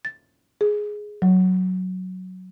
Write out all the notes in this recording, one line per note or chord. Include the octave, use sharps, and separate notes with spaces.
A6
G#4
F#3